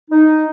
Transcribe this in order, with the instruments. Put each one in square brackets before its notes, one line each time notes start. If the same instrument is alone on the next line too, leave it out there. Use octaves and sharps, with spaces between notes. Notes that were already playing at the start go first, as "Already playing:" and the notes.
[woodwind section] D#4